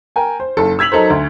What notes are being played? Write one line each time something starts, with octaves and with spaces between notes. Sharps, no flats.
A#4 G5 G#5
C5
F#1 A4
E6 G#6 B6 F7 F#7
F#3 D#4 A4 A#4 C5
D2